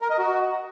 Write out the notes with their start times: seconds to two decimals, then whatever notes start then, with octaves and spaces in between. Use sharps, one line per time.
0.02 A#4
0.10 D#5
0.18 F#4